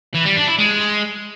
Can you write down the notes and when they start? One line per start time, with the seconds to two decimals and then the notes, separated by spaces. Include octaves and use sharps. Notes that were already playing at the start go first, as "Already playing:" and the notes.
0.15 E3
0.26 G3
0.37 D4
0.48 E4
0.58 G#3